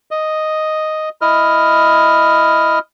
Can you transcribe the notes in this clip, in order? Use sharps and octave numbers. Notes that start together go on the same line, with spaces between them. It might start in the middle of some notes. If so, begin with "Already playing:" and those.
D#5
E4 D#5 F6